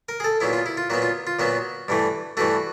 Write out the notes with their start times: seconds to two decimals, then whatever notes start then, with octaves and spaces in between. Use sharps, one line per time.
0.09 A#4
0.20 G#4
0.24 A4
0.40 A#2 F#3 B3 E4
0.53 F4
0.66 E4
0.77 F4
0.90 A#2 F#3 B3 F#4
1.02 F4
1.27 F4
1.39 A#2 F#3 B3 F#4
1.88 G2 E3 A3
2.37 G2 E3 A3 F#4